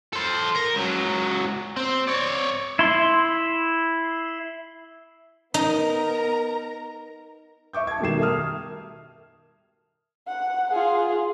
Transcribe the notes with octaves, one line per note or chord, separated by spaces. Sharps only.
A4 C5
A#4
C#2 F#3
C4
C#5 D5
E4 C6
B3 D#4 A#4 A#5
E5 C#6 D6 G6
A5 G#6
B2 D#3 G3 C7 E7
A#4 E5 A5 D#6 F6
F#5
F4 G#4